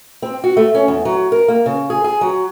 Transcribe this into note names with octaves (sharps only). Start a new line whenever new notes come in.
C4
F#4
A3
C#4
E2
F#3
A#4
A#3
C#3
G#4
G#4
F#3